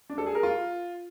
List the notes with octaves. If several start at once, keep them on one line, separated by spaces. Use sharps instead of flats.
D4
A4
G#4
A#4
F4